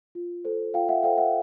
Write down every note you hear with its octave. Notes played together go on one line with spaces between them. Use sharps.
F4
A4 C5
F4 F5 G5
E5 F#5
A4 C5 F5 G5
E5 F#5